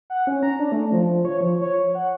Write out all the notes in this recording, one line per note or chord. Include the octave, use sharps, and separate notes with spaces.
F#5
C#4
A#5
D4
A3
F3
C#5
F3
C#5
F#5